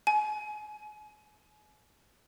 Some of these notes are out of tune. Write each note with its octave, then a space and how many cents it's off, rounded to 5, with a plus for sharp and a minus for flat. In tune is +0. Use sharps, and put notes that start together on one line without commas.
G#5 +35